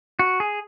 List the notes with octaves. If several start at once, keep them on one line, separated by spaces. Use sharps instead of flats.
F#4
G#4